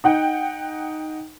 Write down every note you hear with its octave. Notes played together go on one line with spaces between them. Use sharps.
D#4 F#5 G5